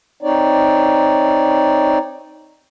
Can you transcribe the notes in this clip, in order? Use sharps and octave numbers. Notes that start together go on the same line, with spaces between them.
C4 D#4 C#5 D5